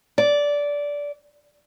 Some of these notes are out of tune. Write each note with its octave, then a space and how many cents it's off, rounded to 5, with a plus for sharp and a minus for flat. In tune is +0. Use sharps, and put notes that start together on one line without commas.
D5 -15